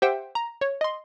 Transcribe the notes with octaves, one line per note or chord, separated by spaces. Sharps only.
G4 C5 E5 F#5 G5
A#5
C#5
D#5 C6